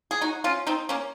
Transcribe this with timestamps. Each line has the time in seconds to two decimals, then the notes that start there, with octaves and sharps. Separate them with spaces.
0.11 G#4
0.21 D#4 F#4
0.44 C#4 F4
0.67 C4 D#4
0.89 A#3 C#4